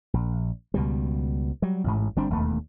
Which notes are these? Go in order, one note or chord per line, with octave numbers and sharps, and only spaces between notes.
A#1
C#2 B2 G3
F#3 G3
A1 G#2
G1 G3 C4 D4
E1 D#2 A3